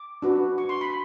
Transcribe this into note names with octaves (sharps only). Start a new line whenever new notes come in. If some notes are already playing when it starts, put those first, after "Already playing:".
Already playing: D6
D4 F#4 B4
C#6
C6
B5